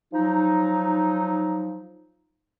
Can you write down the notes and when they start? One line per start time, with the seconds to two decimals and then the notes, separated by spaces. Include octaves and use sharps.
0.13 F3 F#3 D#4